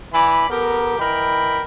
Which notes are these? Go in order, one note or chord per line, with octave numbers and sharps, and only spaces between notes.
E3 D5 G#5 B5
B3 G4 A4 A#4
E3 A#4 D#5 G5 B5